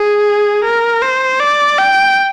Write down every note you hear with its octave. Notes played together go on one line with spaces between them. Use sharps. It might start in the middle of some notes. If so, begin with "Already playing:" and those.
Already playing: G#4
A#4
C5
D5
G5